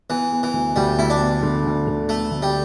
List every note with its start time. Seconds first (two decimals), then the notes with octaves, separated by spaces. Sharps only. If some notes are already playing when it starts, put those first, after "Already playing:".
0.10 E3 B3
0.32 B3
0.43 E3
0.53 D2
0.76 D2 G3
0.98 D2 E4
1.10 D4
1.21 B3
1.42 D3
1.65 D2
1.87 D3
2.09 A3 B3
2.31 D2
2.42 G3